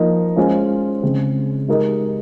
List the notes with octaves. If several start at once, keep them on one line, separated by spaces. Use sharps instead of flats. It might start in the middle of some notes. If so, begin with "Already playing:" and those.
Already playing: F3 A#3 D#4
G#3 C#4 F4 C5
C#3 G#3 C4
G#3 D#4 G4 A#4 D#5